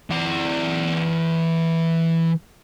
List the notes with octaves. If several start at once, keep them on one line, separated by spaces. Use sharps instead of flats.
E3 D5